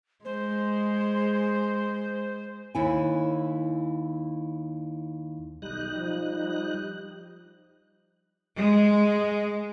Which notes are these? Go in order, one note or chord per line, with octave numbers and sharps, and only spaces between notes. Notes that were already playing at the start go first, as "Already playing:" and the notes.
G#3 C5
D#2 E4 G#5
B1 G3 D#4 F#6
F3
G#3